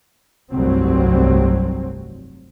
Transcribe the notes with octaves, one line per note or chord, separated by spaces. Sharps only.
F1 C2 G2 F#3 C4